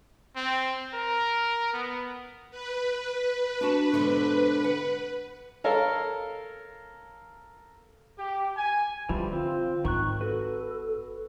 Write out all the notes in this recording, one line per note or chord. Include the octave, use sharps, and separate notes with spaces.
C4
A#4
B3
B4
D4 F#4 A5
G#2 B2 D3
F#5
A4 A#4 C#5 F5
G4
G#5
D3 E3 F3 G3
C4 F4
G#1 D#3 C#6 F#6
F#4 A4 B4